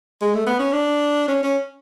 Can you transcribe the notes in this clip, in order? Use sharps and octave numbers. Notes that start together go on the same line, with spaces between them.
G#3
A3
B3
C#4
D4
C#4
C#4